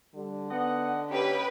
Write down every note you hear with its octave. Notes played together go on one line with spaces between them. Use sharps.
D3 G3
B3 D#4 D#5 F#5
B2 A#3 C#4 G4 B4